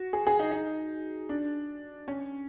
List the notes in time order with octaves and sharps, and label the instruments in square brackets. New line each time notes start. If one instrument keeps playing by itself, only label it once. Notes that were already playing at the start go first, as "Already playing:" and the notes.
Already playing: [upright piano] F#4
G#4
G#4
D#4
D#4
D4
C#4